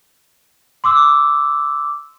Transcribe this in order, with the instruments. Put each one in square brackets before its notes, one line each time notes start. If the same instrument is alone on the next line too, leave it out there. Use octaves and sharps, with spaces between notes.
[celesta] C6 D6 E6